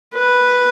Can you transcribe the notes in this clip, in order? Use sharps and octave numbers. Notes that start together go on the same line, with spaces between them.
B4